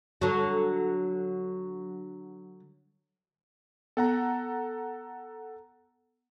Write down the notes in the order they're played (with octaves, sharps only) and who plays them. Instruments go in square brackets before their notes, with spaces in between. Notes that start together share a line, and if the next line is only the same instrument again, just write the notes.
[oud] D3 F#3
[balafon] B3 [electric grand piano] A4 F#5 A#5